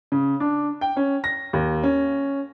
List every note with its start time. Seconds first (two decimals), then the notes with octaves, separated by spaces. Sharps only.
0.12 C#3
0.40 D4
0.81 G5
0.97 C#4
1.24 A#6
1.53 D#2
1.83 C#4